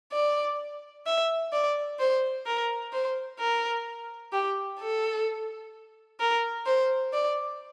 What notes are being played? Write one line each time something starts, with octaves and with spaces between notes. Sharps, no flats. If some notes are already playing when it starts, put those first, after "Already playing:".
D5
E5
D5
C5
A#4
C5
A#4
G4
A4
A#4
C5
D5